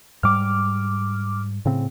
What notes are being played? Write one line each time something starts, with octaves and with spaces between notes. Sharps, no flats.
G#2 G3 D6 F6
A2 C#3 C4